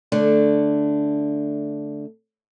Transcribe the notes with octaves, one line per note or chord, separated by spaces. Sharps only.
D3 A3 D4